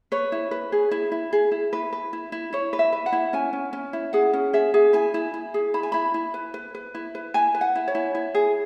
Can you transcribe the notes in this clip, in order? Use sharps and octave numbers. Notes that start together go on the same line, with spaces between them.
B4 C#5
E4
B4
G#4
E4
E4
G#4
E4
E4 B4
B4
E4
E4
E4 C#5
B4
E5
B4
F#5
E4
C#4 G#5
C#4
C#4
E4
G#4 F#5
C#4
G#4 E5
G#4
E4 G#5
E4
E4
G#4
E4 B5
G#5
E4 B5
E4
B4
B4
B4
E4
B4
E4 G#5
B4
F#5
E4
C#5
E4
E4
G#4